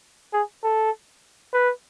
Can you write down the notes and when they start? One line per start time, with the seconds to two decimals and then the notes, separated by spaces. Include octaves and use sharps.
0.33 G#4
0.63 A4
1.53 B4